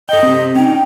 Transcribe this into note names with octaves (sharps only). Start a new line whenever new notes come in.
A4 D#5 G5
C4 G4
C#4 D#4 G5
G5